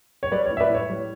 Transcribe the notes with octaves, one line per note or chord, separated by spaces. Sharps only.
C#5
G3 B4 D5
C#5
A2
E5
B4 D5
A2 C#5
G3